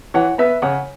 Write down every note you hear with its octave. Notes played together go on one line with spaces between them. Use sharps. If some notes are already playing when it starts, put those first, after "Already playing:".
E3 C#5 F#5
B3 B4 E5
C#3 C#5 F#5